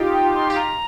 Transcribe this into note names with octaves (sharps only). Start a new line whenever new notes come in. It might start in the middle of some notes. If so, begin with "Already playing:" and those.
Already playing: D#4 F4 G4
G5
C6
G4
F4 A#5